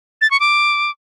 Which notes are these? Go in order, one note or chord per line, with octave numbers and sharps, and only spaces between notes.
A6
C#6
D6